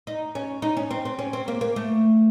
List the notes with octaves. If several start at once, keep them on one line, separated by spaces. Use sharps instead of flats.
D#4
C#4
D#4
C#4
C4
C4
C#4
C4
A#3
A#3
A3